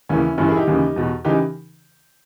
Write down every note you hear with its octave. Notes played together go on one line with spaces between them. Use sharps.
D#2 C#3 E3 C#4 E4
G2 E3 C#4 E4
E4 G#4
D#4 G4
D#2 C#3 E3
E2 B2
C#3 E3 D#4 G4